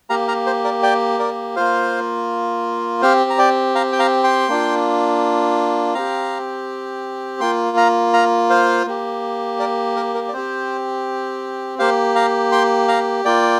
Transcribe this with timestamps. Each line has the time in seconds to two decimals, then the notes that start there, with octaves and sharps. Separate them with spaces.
0.10 A#3 G4 F5 A#5
0.28 F5 A#5
0.46 C5
0.64 A#4 D5
0.83 D5 G5
1.19 A#4 D5
1.56 A#3 F4 C5 F5
3.02 C4 G4 C5 F5
3.30 A#5
3.38 D5 G5
3.75 F5 A#5
3.92 G5
3.99 F5 A#5
4.24 G5 C6
4.48 A#3 D4 F4
5.94 C4 G4 F5 A#5
7.40 A#3 F4 G5 C6
7.77 F5 A#5
8.13 F5 A#5
8.50 C5 F5
8.86 A#3 G4
9.60 A#4 D5
9.96 A#4
10.14 A#4
10.29 D5
10.33 C4 G4 C5
11.79 A#3 G4 C5 F5
12.15 F5 A#5
12.52 G5 C6
12.88 F5 A#5
13.25 A#3 F4 D5 G5